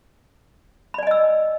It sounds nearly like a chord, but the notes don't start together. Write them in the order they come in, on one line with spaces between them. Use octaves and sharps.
B5 D5 G#5 D#5 E6